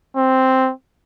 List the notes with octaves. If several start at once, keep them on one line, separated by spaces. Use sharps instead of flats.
C4